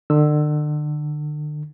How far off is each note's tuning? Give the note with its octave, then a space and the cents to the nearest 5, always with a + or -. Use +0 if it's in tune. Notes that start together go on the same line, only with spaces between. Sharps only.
D3 +35 E6 +0